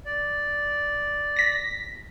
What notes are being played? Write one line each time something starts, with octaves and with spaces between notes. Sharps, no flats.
D5
A#6 B6